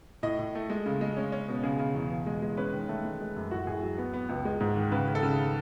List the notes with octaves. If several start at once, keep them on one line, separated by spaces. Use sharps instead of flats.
A2 D#5
A2
A3
G#3
C#3
G#3
C#4
C#4
B2
C#3 G#4
C#3
E2
B2
G#3
G#3
C#4 B4
D#3
A3
G#3
G#3
F#2
A2 F#4
A2 G#4
F#3
B3
B3
C#2
G#3
G#2
D#3
C#3 B4
C#3
A4
C#3